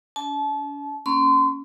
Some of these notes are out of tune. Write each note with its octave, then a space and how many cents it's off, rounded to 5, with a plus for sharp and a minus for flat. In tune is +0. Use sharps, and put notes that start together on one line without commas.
C#4 +45 A5 -30
A#3 +0 C#4 +0 C6 -30